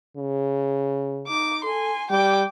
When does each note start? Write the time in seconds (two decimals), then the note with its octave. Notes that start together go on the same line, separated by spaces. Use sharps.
0.17 C#3
1.27 D#4 D6
1.64 A4 G#5 C6
2.10 G3 G5 D6